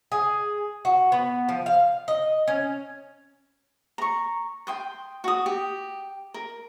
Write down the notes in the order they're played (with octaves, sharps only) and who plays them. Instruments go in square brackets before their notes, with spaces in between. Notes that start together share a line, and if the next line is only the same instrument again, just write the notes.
[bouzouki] G#4
F#4
B3
F3
F5
D#5
C#4
[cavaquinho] A#5 C#6
G5 C6 D#6
F#4 D#6
G4
A#4